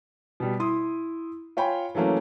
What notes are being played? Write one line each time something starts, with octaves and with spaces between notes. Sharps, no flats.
B2 G3
E4 C6 D#6
F4 C#5 G5 G#5 B5
E3 F#3 A3 A#3 C#4